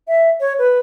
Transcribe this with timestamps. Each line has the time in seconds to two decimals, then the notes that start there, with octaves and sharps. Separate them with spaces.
0.08 E5
0.40 C#5
0.59 B4